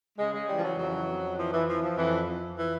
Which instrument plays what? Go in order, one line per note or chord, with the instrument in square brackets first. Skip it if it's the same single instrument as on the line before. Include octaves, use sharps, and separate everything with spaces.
[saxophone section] C#3 G#3
G#3
E3 G3
F3
F#3
F2 F#3
F2
E3 F3
E3
E3 F3
F3
F2 E3
F2
E3